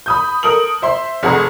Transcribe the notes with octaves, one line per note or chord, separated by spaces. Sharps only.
B5 D#6 G6
A4 A#4 D#6 F#7
C5 E5 C6
F1 G#4 F#5 A#5